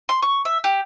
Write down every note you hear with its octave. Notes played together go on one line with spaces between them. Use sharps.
C6
C#6
E5
G4